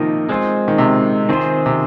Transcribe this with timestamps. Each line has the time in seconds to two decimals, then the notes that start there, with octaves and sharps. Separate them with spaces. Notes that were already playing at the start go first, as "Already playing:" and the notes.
Already playing: C3 D#3 F3 A#3 D#4 A#4 D#5
0.29 G#3 C4 F4
0.68 D#3
0.78 C3
1.29 D#3 C4 F4 G#4 C5
1.66 C3